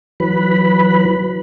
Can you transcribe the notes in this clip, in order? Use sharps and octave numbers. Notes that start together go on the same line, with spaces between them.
E3 F#3 B4 B5